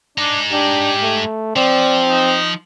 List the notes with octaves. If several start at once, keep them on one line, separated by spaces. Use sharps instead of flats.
G#3 D4 D#4
D4 G4
A3
F3 C4 D5
D#4